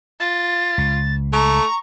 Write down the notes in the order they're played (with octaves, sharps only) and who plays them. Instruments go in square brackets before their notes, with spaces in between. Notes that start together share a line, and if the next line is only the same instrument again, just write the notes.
[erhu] F4 [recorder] A6
[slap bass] C#2
[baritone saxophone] A3 [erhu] A#5 [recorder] C#6